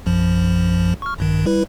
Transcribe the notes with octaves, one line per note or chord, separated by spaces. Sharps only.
A#1 F#2 F3
C#6 F6
A#1 G2 D#3
G3 E4 B4